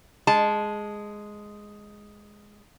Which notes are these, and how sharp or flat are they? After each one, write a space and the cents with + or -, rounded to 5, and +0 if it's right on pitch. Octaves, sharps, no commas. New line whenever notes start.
G#3 +0 A5 -20